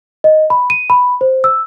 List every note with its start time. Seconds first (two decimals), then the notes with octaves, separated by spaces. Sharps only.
0.24 D#5
0.50 B5
0.70 D#7
0.90 B5
1.21 C5
1.44 E6